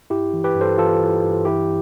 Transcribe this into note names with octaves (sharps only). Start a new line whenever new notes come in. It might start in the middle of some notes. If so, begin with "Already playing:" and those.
G2 E4 G4
E3
G4 B4
G2
A4 C5
E3 F4 A4
E3
G2
E3 E4 G4